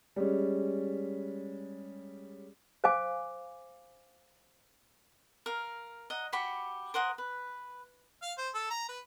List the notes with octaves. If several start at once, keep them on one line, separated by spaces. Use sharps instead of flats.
G3 G#3 C#4
C5 F5 G#5 D6
A#4 F5
D#5 F#5 A#5
F#4 G4 B5 C#6
A#4 C5 F#5 D#6
B4
F5
C5
A4
A#5
B4